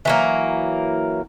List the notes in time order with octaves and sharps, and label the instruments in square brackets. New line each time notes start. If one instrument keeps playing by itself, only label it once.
[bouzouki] E3 F#3 A#3